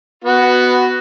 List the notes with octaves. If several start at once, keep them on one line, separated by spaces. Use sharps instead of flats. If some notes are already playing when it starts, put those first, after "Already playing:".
B3 F#4